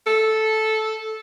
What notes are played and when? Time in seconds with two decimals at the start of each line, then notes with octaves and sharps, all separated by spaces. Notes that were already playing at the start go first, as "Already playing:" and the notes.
0.07 A4